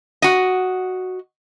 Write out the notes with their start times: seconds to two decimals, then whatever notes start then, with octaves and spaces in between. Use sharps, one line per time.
0.22 F#4 D#5